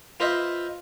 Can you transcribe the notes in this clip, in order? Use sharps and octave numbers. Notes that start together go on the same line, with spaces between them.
F4 B4 C5 D#5 E5